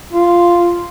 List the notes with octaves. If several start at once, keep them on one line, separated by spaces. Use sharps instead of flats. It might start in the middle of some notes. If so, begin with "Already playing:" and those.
F4